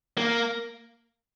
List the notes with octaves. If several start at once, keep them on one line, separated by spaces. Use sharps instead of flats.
A#3